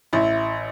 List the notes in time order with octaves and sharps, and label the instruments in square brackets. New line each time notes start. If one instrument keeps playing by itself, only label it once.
[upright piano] A1 E4